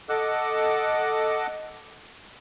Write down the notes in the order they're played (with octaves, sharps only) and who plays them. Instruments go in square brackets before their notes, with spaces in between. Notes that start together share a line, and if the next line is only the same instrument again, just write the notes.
[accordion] A4 D#5 F#5 D6 E6 F#6